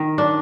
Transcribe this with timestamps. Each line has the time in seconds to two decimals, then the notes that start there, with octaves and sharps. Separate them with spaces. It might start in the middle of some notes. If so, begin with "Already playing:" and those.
Already playing: D#3
0.18 D4